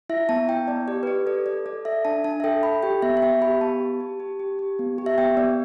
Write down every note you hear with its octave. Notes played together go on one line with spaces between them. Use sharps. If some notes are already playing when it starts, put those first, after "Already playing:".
E4 E5
B3 A5
E4 G5
B3 D5
G4 D5
B4
G4 D5
A4 D5
A4 D5
A4 D5
A4 E5
D4 A5
D4 A5
E5
A4 G5
A4 B5
G4 G5
B3 E5
E5
B3 G5
G4 B5
B3 A5
G4
G4
G4
G4
G4
B3
G4
E5
B3 G5
B3 D5